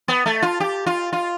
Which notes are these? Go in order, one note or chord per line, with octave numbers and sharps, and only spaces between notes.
B3
A3
F4
G4
F4
F4